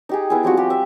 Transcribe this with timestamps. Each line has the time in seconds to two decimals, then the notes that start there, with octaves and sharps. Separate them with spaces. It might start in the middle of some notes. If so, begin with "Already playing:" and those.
0.09 D#4 G4 G#4
0.30 B3 E4 G#4
0.43 F3 G3 C4 F#4
0.57 G4
0.70 E5